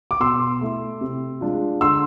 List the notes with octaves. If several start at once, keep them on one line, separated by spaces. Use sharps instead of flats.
D6
B2 C6 E6
A3 E4
C3
G#3 D4 F4
D3 C6 E6